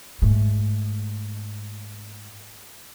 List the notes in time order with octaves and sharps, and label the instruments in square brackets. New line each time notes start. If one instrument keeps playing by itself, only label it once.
[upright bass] G#2 A3